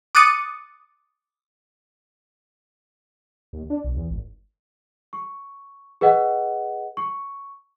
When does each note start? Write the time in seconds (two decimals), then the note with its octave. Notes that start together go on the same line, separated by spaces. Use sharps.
0.15 D6 D#6 F#6 A6 C#7 D#7
3.53 D#2
3.70 D4
3.84 B1
3.97 E2
4.11 G#1
5.13 C#6
6.01 G#4 B4 D#5 F#5
6.97 C#6